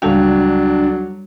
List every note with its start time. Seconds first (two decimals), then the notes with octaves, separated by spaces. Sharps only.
0.02 C#2 F#3 G3 D4 A4 F5 G5